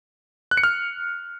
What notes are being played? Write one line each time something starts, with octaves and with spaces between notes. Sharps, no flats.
F#6
C#7
F6